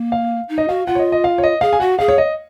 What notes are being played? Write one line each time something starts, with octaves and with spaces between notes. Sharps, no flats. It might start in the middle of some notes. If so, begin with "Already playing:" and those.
Already playing: A#3
F5
D#4
D#5
F#4 F5
F4 F#5
C#5
D#5
D#5
F5
C#5
D#5
G#4 F5
G#5
F#4 F#5
G#4 F5
C#5
D#5